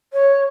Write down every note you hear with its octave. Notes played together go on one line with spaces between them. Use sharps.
C#5